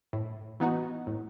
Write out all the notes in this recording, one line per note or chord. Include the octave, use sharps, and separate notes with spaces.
A2
E3 B3 D#4 F#4
A2